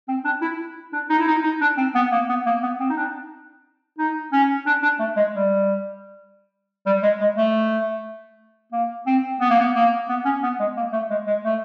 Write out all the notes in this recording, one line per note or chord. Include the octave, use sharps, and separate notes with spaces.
C4
D4
E4
D4
D#4
E4
D#4
D#4
D4
C4
B3
A#3
B3
A#3
B3
C4
D#4
D4
D#4
C#4
D4
D4
A3
G#3
G3
G3
G#3
G#3
A3
A#3
C4
B3
A#3
B3
A#3
B3
C#4
B3
G#3
A#3
A3
G#3
G#3
A3